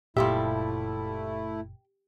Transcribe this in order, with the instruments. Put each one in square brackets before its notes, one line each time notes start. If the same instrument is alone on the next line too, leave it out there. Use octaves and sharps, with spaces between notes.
[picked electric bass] F#1 A#2 [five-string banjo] F3 G3 E5 [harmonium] A3 E4 [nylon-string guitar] G4